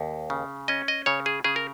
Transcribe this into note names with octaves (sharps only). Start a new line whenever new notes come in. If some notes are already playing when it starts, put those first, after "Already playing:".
Already playing: D#2
C#3
C#4 D#5
D#5
C#3 C#5
G#4
C#3 G#4
A#4